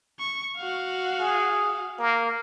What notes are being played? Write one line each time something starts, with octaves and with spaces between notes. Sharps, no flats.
C#6
F#4 F5
G#4
A#3